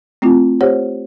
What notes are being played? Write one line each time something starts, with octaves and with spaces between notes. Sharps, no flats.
A3 C4 E4 F4
G4 C5 C#5 F#5